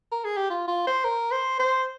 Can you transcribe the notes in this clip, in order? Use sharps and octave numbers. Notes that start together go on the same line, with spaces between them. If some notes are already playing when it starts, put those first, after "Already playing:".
A#4
G#4
G4
F4
F4
C5
A#4
C5
C5